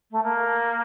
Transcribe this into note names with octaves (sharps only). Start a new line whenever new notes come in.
A3
A#3